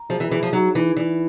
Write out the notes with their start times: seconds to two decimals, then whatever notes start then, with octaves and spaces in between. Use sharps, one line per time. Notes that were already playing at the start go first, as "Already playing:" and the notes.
Already playing: A#5
0.09 F3 G#4
0.20 E3
0.31 E3 G#4
0.43 F3
0.53 F#3 D#4
0.75 E3 D#4
0.96 E3 D5